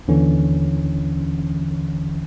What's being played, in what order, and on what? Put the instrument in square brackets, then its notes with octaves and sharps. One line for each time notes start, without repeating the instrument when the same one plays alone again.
[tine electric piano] D#2 D3 E3 C#4